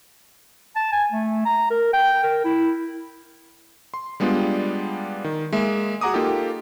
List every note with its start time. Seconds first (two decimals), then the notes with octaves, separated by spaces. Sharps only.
0.76 A5
0.92 G#5
1.12 A3
1.45 A#5
1.71 A#4
1.93 G5
2.23 A#4
2.45 E4
3.94 C6
4.20 G3 G#3 B3 D4 F4 G4
5.24 D#3
5.52 G#3 A#3 E5
6.01 F#4 G#4 F#5 A#5 D6 D#6
6.14 A#3 D#4 F4 G4 A4